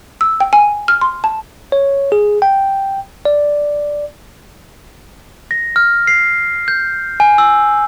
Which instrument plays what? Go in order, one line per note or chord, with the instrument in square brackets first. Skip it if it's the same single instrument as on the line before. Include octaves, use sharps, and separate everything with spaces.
[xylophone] E6
G5
G#5
F6
C6
A5
[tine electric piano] C#5
G#4
G5
D5
[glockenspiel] A#6
F6
C7
G6
G#5
E6